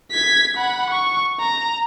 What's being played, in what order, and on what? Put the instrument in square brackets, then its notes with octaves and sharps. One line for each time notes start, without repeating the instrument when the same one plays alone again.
[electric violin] G#6 B6
F#5 B5
C#6
A#5